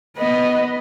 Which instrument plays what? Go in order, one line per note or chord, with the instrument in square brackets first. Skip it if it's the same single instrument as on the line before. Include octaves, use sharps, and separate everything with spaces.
[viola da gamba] B3 [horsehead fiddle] B4 D#5